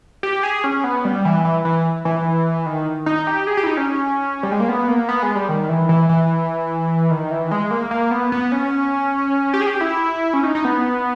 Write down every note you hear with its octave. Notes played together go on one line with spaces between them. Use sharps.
G4
G#4
C#4
B3
G3
E3
E3
E3
E3
D#3
D#4
G4
G#4
G4
E4
D#4
C#4
G3
G#3
A#3
B3
A#3
B3
G#3
G3
D#3
E3
E3
E3
D#3
E3
G#3
A#3
A#3
B3
B3
C#4
G4
G#4
G4
E4
C#4
D#4
D#4
B3